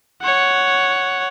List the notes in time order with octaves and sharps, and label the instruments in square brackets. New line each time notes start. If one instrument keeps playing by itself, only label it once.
[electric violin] C#5 F#5